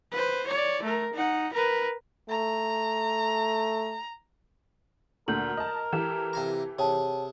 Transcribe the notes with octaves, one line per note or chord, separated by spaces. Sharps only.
B4 C5
C#5 D5
A3 A#4
D#4 F#5
A#4 B4
A3 A#5
D2 A#2 D3 A#4 G6 F#7
D#5 A5
E3 G4 A4 E7
C3 F5 A#5
C3 G#4 C#5 G5 A5